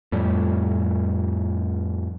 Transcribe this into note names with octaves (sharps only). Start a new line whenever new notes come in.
F2 A2 G3